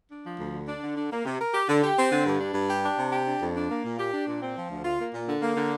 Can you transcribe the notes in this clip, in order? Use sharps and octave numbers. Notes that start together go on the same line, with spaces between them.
D4
F3
D2
D3
D4
D3
D4
A#3
C3
A#4
G4
D3
G4
C4
D3
G2
D4
G2
G4
D4
C3
G4
D4
F2
D4
A#3
A#2
G4
D4
A#2
C4
F3
D2
F4
A#3
A#2
D3
A#3
D3